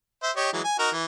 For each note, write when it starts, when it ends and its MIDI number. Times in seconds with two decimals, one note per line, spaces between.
0.23 0.31 72
0.23 0.31 76
0.36 0.52 67
0.36 0.52 73
0.36 0.52 75
0.53 0.61 52
0.53 0.61 54
0.53 0.61 56
0.64 0.75 80
0.79 0.90 63
0.79 0.90 66
0.79 0.90 70
0.92 1.05 52